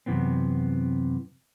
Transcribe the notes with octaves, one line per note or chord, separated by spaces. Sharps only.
F#2 C3 E3 B3 C4